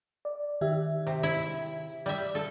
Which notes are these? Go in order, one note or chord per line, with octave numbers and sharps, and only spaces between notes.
D5
D#3 G4 E5
C3
E4
G3 E5
A4